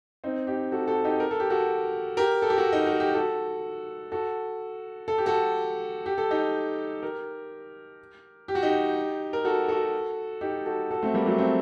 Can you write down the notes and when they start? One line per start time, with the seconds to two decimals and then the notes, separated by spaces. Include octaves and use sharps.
0.24 C4 D#4
0.47 D#4 G4
0.72 F#4 A4
0.88 F#4 A4
1.05 D#4 G4
1.20 A#4
1.31 A4
1.40 G4
1.50 F#4 A4
2.17 G4 A#4
2.42 A4
2.50 G4
2.58 F#4 A4
2.73 D#4
2.86 F#4
3.00 G4
3.14 F#4 A4
4.12 F#4 A4
5.08 A4
5.18 G4
5.26 F#4 A4
6.06 G4
6.18 A4
6.31 D#4 G4
7.02 G4 A#4
8.48 G4
8.55 F#4
8.63 D#4 G4
9.33 A#4
9.45 F#4 A4
9.68 F#4 A4
10.41 D#4 G4
10.66 F#4 A4
10.91 F#4 A4
11.02 A3 C4
11.14 G3 A#3
11.26 F#3 A3
11.38 A3 C4